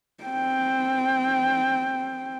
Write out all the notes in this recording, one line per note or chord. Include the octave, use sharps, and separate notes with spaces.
C4 G5